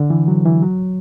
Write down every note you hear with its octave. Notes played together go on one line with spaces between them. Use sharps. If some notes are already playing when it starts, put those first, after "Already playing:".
Already playing: D3
E3
F#3
E3
F#3